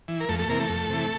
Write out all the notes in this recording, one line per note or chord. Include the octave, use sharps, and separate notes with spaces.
E3
A#4
F2 A3 A4
A3 A4
C3 E3 A#3 A#4
A3 A4
F2
C3 E3